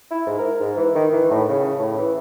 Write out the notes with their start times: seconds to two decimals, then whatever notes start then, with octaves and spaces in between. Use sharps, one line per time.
0.11 E4
0.26 G#2
0.38 A#4
0.60 G#2
0.77 E3
0.95 D#3
1.13 E3
1.31 A2
1.49 C#3
1.79 A2
1.98 E3